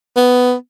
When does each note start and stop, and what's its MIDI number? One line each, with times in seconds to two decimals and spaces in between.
0.16 0.54 59